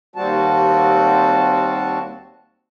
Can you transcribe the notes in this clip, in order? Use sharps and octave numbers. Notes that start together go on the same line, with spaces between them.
D#2 G3 C4 F#4 A5